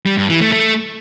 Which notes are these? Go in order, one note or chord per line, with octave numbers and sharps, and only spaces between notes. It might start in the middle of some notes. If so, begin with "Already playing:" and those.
G3
G2
E3
A3
A3